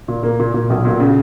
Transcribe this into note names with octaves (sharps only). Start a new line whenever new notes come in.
A#2
A#3
A#2
A#2
B1
A#2
C#3